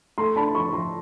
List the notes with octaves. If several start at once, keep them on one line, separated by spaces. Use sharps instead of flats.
A3 A#5 C6
D4 A5 B5
F3 B5 C#6
C#6
F3 A#5 C6